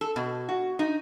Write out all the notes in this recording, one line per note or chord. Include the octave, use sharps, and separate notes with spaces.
A4
B2
F#4
D#4